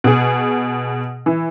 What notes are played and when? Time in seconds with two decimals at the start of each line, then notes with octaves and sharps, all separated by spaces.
0.04 B2 G#4
1.26 E3